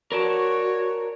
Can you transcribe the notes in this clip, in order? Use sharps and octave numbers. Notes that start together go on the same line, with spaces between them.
F#4 A#4 C#5 D5 A5